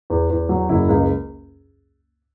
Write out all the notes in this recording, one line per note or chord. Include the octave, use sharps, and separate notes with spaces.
E2
E2
F#3
F#1 E4
C#2